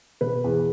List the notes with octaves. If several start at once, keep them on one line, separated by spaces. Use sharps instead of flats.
B2 B4
E2